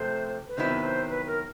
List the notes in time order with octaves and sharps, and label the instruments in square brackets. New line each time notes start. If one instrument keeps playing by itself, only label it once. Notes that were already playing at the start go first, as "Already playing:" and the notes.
Already playing: [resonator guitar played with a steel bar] C3 F3 A3 [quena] C5
[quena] B4
[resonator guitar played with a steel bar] C3 D#3 F#3 B3 E4 [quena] C5
[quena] B4
C5
B4
A#4